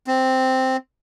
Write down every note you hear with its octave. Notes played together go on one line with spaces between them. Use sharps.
C4